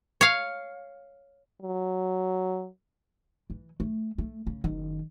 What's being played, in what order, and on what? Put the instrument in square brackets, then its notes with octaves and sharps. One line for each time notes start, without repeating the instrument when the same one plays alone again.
[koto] C#5 F5
[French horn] F#3
[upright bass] E3
A3
A3
C#3
F#1 D#3